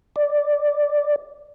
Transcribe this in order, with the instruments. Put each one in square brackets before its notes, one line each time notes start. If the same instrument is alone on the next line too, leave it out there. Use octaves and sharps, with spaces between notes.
[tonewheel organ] D5